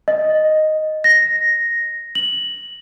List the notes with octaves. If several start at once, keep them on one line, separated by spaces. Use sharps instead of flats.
D#5
A#6
F#7